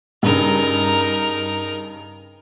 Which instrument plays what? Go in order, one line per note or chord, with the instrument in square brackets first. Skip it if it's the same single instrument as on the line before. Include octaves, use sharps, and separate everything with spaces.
[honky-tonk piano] G2 C#3 [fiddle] D#4 A#4